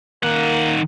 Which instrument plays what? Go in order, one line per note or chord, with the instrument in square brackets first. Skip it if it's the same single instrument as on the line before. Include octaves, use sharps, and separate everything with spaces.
[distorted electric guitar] D#3 F#5 [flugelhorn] A#3